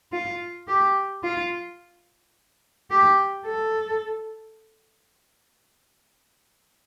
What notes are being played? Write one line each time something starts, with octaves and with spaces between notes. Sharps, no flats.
F4
G4
F4
G4
A4